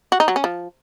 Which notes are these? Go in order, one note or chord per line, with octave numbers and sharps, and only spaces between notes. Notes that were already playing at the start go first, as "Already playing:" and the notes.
F#4
D#4
F#3
C#4
F3